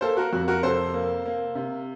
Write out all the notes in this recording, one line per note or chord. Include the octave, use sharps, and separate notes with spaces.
A#3 A4 C5
F#4 A#4
F2 F#4
F#4 A#4
C3 A4 C5
A#3
A#3
C3